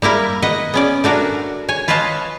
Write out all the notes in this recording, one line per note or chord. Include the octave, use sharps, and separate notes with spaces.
G3 A#3 E4 A#4
B4 D#5 F#5
B3 C#4 D5
A3 D4 F#4 A#4
C#5 G#5
F4 B4 C#5 D#5 F5 A5